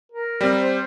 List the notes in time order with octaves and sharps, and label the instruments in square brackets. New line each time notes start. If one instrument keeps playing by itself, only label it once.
[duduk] A#4
[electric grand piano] G3 C4
[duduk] C5